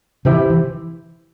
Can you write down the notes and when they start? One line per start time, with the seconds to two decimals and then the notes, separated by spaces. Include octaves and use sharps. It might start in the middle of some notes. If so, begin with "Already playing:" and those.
0.25 C3 E3 E4 G4 C5 E5
0.50 E3